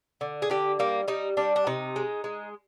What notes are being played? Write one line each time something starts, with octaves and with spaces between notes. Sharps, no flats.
D3
G#4
D3 G4
G3 A#3
G3 D#4
G3 D4
D4
C3 D#4
G#3
G#3